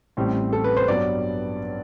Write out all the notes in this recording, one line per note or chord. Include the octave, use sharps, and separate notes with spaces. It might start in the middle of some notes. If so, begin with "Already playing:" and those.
A1 A2 G3 C4
A4
B4
C5
G2 F#3 B3 D5